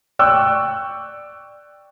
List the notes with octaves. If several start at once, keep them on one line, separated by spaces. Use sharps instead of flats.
D5 G5 C#6 E6 F#6